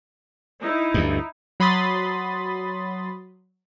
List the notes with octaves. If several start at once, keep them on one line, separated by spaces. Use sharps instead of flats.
D#4 E4
D2 G2
F#3 B5 C6 D#6 A6